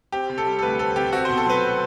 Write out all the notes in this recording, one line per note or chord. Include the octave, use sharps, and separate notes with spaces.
C4 G4
C3
A4
G3
A4
D2 B4
C4 A4
C3 G4
C4 F#4
B2 C5
A4
F#3 B4